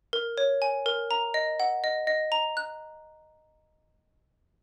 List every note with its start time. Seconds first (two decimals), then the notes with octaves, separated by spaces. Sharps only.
0.13 A#4
0.38 C#5
0.62 G#5
0.86 A#4
1.11 A#5
1.34 D#5
1.60 F#5
1.84 D#5
2.07 D#5
2.32 A#5
2.57 F#6